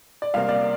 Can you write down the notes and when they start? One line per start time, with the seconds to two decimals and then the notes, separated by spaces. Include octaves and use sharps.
0.22 D5
0.34 C2 C3 A#3 F5
0.49 D5